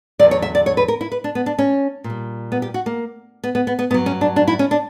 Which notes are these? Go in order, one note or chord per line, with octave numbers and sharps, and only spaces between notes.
E2 D3 F#3 D5
C#5
E5
D5
C#5
B4
A#4
E4
B4
D4
B3
D4
C#4
A#2
G3
B3
G4
F#4
A#3
B3
B3
B3
B3
G2 F#3 B3
C#4
D4
D4
E4
C#4
D4